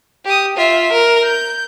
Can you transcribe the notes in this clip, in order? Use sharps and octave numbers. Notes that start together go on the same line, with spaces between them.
G4 D#6
F4 E5
A#4
G6